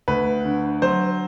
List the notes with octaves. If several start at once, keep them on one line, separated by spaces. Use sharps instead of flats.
D2 B4
D3
F#3 C5